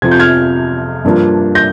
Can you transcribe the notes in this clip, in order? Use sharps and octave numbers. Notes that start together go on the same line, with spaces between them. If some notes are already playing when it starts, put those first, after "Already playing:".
F2 C3 F3 G#6
G6
F6 G#6
G2 F3 A#3 D4
G6 A#6